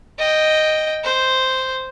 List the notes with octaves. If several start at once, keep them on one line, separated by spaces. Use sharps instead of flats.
D#5 G5
C5